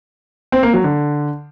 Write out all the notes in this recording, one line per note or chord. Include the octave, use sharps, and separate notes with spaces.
C4
A#3
F#3
D3